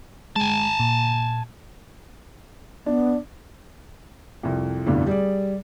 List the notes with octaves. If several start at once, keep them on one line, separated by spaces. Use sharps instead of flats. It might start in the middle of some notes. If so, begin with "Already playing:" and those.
G#3 G#5 A5
A#2
B3 D4
C2 F2
F1 G2 B2 D3 A3 E4
G3 G#4 D5